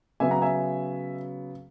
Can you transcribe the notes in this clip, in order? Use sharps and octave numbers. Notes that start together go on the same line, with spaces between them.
C#3 F#3 B3 E5 G#5
F#5 A#5
E5 G#5